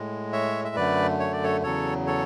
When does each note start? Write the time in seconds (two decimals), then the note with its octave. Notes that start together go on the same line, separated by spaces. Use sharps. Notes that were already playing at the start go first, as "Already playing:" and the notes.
Already playing: A2 G#3
0.33 C#5 E5
0.65 E5
0.76 F#2 D3 A3 B4 D5
1.20 C#5
1.32 D5
1.44 A4 C#5
1.63 E2 C#3 F#3 A4 C#5
2.07 A4 C#5